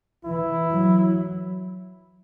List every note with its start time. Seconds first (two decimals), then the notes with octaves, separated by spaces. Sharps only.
0.24 E3 E4
0.70 F#3